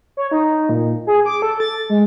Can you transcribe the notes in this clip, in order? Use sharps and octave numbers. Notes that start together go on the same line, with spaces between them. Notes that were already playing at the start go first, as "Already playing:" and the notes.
C#5
D#4
A#2
G#4
D6
A4
A6
G#3